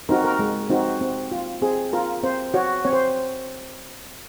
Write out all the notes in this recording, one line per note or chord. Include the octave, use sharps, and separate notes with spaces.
C4 D#4 F#4 A#4
A#4
G#3
C4 D#4 F#4
C4
F4
C4 G#4
F4 A#4
C4 C5
F#4 C#5
C4 C#5
C5